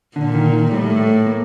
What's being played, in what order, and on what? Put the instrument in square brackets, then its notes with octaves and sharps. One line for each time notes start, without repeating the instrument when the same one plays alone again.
[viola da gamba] A#2 [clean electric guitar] D3
[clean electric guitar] D#3
D#3
[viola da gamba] A2 [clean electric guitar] G3
[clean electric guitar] A3
A#3